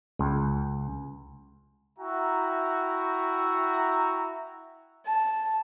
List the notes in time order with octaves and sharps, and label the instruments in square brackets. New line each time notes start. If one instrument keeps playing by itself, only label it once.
[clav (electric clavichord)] C#2
[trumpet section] E4 F#4 E5 G5 A#5
[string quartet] A5